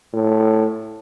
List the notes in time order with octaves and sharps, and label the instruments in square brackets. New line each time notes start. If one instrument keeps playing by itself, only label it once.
[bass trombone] A2